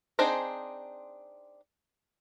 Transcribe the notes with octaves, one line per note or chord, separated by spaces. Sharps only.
C4 D4 D#4 G#4 C5